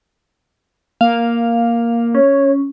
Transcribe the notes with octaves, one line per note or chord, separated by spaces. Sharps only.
A#3 F5
C#4 C#5